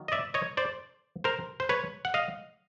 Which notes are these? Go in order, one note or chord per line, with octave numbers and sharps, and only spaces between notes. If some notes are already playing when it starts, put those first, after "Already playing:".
Already playing: D#3 F#3 A#3
D#5
D5 E5
C#5 D#5
C5 D5
A#4 C5
C5
B4 C#5
F#5
D#5 F5